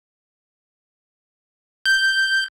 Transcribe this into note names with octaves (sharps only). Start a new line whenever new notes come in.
G6